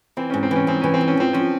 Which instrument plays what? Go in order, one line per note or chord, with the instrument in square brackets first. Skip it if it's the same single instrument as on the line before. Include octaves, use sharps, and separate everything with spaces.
[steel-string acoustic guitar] E3 [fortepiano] C4
[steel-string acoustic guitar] G#2 [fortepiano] C#4
[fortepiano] C4
[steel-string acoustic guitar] E3 [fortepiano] C#4
[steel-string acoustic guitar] G#2 [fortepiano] C4
[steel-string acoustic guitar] E3 [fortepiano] C#4
[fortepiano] C4
[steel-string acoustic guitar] G#2
[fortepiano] C#4
[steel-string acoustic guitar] F3 [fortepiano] C4
[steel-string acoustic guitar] F3 [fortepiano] C#4